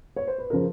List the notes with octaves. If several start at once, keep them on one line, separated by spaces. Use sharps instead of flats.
C#5
C5
B4
C#3 F3 A#4